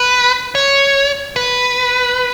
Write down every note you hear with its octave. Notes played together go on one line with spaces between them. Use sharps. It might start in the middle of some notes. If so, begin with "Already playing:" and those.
Already playing: B4
C#5
B4